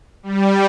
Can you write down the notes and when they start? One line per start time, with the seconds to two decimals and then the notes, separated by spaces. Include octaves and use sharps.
0.23 G3